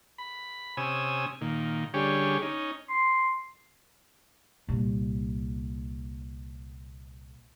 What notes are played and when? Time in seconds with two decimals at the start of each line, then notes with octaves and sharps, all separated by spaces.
0.18 B5
0.77 C3 C#4 G#5 D#6 E6
1.41 A#2 D#3
1.94 D3 G3 C#4 G4 G#4 C#5
2.42 C#4 D#4
2.89 C6
4.68 C2 A#2